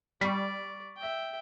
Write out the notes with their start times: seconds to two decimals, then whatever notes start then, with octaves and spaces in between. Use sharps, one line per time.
0.21 G3 D5 C#6 B6
0.97 E5 G5